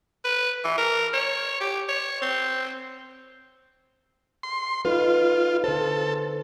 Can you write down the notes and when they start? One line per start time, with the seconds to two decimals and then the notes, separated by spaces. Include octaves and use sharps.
0.24 B4
0.64 E3
0.78 A#4
1.14 C#5
1.60 G4
1.89 C#5
2.22 C4
4.43 C6
4.85 D#4 F4 A4 B4
5.64 D3 A4 C5